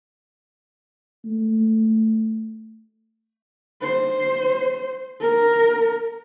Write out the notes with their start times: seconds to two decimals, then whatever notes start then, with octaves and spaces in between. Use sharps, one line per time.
1.26 A3
3.81 C5
5.20 A#4